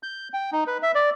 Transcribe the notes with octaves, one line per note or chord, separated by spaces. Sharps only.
G6
G5
D#4
B4
E5
D5